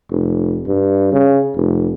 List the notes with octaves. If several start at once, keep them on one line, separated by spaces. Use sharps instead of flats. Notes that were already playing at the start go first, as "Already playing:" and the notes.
F1
G2
C#3
F1